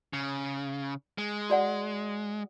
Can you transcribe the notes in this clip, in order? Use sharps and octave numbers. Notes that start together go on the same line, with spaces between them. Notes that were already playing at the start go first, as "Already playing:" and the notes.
C#3
G#3
F#4 D5 F#5